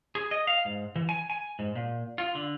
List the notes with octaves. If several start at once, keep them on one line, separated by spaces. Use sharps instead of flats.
G#4
D#5
F5
G#2
E3
G#5
G#5
G#2
A#2
F4
D3